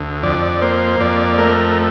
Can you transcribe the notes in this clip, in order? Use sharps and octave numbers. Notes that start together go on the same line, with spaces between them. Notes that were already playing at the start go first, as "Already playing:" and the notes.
Already playing: D2
F2 D5
A#3 C5
F2 D5
A3 A#4